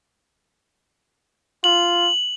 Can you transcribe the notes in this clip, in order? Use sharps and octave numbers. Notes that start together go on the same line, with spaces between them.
F4 F#7